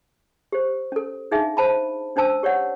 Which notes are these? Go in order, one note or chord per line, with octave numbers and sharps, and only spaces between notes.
G4 C5
C#4 A4
D4 D#4 G#4 E5 F5
C5 A5 B5
C#4 D4 C5 A5 E6
G4 C#5 D5 F#5